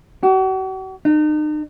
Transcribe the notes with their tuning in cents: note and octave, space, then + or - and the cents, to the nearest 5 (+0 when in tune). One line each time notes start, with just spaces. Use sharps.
F#4 +40
D#4 -40